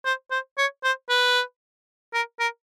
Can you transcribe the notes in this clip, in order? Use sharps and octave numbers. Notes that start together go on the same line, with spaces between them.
C5
C5
C#5
C5
B4
A#4
A#4